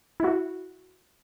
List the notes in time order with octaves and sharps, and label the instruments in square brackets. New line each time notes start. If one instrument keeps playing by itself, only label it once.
[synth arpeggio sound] E4 F#4